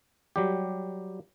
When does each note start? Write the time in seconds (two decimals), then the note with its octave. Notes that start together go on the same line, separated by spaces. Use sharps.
0.36 F#3 G3 G4